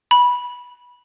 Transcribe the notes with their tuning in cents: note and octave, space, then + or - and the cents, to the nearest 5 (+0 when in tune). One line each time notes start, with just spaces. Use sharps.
B5 -15